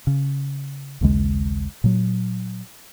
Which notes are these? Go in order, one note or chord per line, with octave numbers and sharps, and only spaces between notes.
C#3
A#1 D#2 C#3 G#3
A#2 F#3